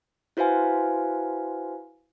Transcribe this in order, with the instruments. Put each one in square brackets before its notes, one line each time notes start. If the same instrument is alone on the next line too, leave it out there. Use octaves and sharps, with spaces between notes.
[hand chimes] E4 F#4 B4 C5 F5 G#5